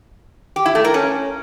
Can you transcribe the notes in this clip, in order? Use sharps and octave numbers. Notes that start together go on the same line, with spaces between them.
G4
E4
A3
A#4
C#4